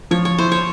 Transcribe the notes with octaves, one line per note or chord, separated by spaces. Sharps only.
F3 C#5
C#5
E4 C5
C#5